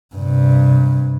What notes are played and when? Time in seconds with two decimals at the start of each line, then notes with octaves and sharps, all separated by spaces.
0.15 G2 C3